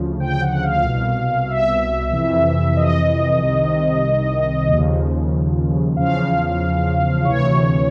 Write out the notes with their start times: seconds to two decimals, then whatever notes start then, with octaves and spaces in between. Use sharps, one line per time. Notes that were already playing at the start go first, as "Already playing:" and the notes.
Already playing: D2 C#3 F3
0.20 G5
0.41 F#5
0.63 F5
0.84 C2 B2
1.48 E5
2.12 F2 C3 E3
2.77 D#5
3.41 C2 C3 D#3
4.69 D#2 C#3 F3
5.97 E2 C#3 F3 F5
7.24 D2 C3 E3 C#5